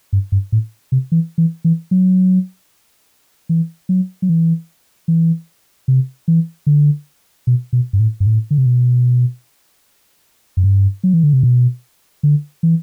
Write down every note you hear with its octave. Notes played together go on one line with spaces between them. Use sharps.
G2
G2
A2
C3
E3
E3
E3
F#3
E3
F#3
F#3
E3
E3
C3
E3
D3
B2
B2
G2
A2
G2
A2
D3
C3
B2
F#2
G2
F#3
E3
D3
C3
B2
D3
E3